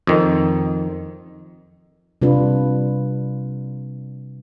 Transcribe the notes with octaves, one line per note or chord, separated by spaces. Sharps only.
F2 D#3
C3 G3 D4 F4 B4